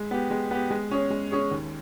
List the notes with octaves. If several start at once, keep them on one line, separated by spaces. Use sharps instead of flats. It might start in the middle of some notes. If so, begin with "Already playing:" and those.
Already playing: G#3
B3 G4
G#3
B3 G4
G#3
C#4 G#4 C#5
G#3
C#4 G#4 C#5
D#2